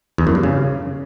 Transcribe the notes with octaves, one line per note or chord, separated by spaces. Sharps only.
E2
F#2
G2
C#3